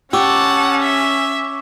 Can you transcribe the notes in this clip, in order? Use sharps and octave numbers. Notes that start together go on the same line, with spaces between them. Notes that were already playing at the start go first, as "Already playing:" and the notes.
C#4 G4 F#5 A5 C#6 D6 E6
E5